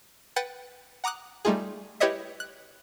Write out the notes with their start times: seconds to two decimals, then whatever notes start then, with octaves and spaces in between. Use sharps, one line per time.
0.36 B4 F#5 G5 F#6 A6 D#7
1.04 F#5 A#5 D6 D#6 F#6
1.45 G3 A3 D#4 F4 G#4
2.00 E4 G4 B4 C#5 D#5 E5
2.40 F#6